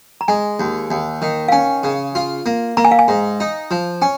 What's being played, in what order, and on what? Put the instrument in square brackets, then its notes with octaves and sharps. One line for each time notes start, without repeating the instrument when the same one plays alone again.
[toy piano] A#5
[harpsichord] G#3 [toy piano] G#5
[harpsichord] D#2
D#2
D#3
[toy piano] F5
[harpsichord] C#4 [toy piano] G#5
[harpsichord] C#3
F4
A#3
[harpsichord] A#3 [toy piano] A#5
[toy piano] G#5
F5
G#5
[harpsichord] G#2
D#4
F3
[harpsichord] C#4 [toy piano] G#5